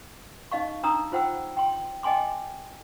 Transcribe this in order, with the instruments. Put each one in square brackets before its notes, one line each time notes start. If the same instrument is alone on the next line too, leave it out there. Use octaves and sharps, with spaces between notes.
[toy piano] D#4 D#5 F5 C#6
D4 D#4 A#5 D#6 E6
F4 C5 F#5 G5 E6
G5 C6
D#5 G5 G#5 C6 D6